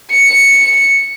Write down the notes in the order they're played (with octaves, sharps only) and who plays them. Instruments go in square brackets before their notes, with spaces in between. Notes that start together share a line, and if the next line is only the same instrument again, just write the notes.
[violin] C#7